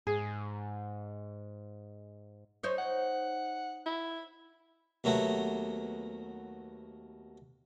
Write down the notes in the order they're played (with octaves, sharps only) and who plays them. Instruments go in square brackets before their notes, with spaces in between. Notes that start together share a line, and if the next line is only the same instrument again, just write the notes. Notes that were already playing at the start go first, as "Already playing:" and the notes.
[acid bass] G#2 [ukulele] G#4
[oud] D#4 C5 C#5
[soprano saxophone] F#5
E4
[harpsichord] D#2 F#3 A3 B3